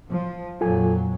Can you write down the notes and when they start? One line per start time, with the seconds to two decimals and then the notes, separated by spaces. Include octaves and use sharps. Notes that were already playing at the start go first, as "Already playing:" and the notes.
0.11 F3
0.61 F2 A#2 F#3 F4 A4 G#5